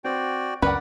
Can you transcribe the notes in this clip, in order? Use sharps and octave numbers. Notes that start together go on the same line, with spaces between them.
C4 F#4 D5 G5
C#2 F#2 C#4 A#4 B4 D5 F#5